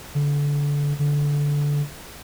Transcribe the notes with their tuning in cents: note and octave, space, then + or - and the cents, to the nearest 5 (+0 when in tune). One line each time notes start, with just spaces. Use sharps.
D3 -25
D3 -15